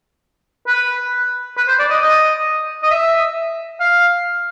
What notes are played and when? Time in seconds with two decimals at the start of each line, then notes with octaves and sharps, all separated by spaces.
0.67 B4
1.57 B4
1.68 C5
1.79 D5
1.90 D#5
2.01 D#5
2.83 D#5
2.91 E5
3.80 F5